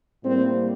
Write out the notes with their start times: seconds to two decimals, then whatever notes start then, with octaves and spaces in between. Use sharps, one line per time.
0.22 A2 G3 A#3 C4